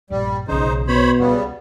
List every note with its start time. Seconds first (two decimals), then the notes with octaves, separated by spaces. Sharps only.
0.10 A#1 G2 G3
0.48 B1 C#3 E3 D#4 C5
0.88 B2 C5 C#5 B5
1.19 C#2 C#3 G3 B3